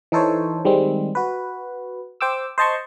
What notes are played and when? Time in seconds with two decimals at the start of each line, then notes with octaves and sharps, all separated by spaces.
0.12 E3 D#4 A4 C5 C#5
0.65 D#3 G3 G#3 C4
1.15 F#4 B4
2.21 C5 G5 D6 E6
2.58 C5 D#5 A5 C6 C#6